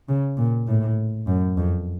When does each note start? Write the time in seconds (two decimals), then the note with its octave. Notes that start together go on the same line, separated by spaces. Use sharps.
0.09 C#3
0.37 A#2
0.68 A2
1.27 F#2
1.57 F2